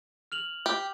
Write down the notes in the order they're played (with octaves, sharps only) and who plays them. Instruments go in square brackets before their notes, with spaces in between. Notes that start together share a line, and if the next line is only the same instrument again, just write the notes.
[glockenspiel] F6 F7 F#7
[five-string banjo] G4